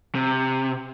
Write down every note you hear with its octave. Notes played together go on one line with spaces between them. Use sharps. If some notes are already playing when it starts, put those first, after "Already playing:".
C3